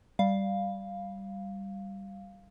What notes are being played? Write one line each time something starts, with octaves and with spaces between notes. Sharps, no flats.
G3 F5